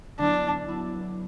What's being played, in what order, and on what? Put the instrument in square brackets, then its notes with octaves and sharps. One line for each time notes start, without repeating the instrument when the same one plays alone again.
[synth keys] D3 F#3 B3 E4 [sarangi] D4
[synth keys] D3 F#3 B3 E4